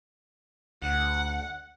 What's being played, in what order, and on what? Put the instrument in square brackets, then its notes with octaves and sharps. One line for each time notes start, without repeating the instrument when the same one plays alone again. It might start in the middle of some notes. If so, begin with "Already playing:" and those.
[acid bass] D2 [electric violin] F#5